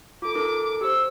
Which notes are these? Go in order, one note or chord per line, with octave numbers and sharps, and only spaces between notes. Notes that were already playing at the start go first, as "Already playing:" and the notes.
F4 A4 D6
D#4 A4 A#4
G4 C5 E6